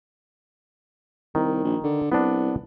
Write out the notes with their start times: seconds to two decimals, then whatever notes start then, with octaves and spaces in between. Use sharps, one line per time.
1.35 C2 D#3
1.64 A#1
1.84 D3
2.12 C2 B3 D4